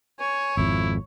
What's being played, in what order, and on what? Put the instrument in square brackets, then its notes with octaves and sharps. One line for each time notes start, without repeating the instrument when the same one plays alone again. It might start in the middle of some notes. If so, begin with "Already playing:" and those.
[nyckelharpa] C#5 [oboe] G#5
[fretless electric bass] G#1 F2 [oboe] E4